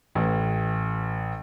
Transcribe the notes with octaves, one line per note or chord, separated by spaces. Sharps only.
A1